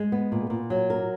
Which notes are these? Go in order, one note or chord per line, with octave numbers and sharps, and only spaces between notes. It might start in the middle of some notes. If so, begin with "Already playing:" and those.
Already playing: G#3
B3
A#2
A#2
F#3
A#4